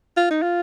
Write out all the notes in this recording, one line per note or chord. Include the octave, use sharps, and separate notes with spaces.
F4
D#4
F4